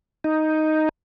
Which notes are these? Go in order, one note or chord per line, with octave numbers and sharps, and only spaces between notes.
D#4